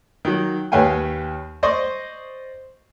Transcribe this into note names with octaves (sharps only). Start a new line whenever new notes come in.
D#3 F#3
D#2 B4 C#5 F5 G5 G#5
C5 D5 D#5 C6 C#6